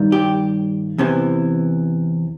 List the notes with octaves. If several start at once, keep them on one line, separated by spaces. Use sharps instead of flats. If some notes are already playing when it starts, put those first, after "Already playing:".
Already playing: G2 D#3 G3
G4
E2 C3 E3